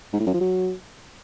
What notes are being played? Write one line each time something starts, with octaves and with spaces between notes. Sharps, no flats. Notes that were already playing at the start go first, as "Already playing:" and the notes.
G#2
A2
F#2
F3
F#3